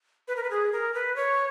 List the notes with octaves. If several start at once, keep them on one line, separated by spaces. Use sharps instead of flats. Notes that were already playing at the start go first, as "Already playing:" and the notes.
B4
A#4
B4
G#4
A#4
B4
C#5